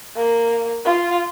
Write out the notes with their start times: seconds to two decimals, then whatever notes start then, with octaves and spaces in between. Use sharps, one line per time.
0.16 A#3
0.85 F4